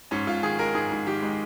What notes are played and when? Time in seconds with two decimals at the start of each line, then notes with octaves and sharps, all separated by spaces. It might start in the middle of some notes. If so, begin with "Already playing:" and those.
0.11 G#2 C#4
0.27 G#2 F4
0.43 D#3 G#4
0.59 G#3 A#4
0.75 G#2 G#4
0.92 G#2
1.07 D#3 G4
1.22 G#3